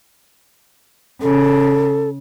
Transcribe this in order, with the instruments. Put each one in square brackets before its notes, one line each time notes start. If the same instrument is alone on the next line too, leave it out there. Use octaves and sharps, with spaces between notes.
[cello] C#3 [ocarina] A4